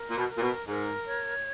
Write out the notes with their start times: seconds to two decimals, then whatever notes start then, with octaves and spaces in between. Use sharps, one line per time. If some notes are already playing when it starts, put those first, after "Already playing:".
Already playing: A#4
0.10 A#2
0.17 B2
0.29 A#4
0.37 A#2
0.42 B2
0.67 G#2 A#4
1.07 C#5